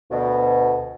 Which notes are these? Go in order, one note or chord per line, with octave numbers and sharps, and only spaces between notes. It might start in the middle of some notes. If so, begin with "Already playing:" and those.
D2 B2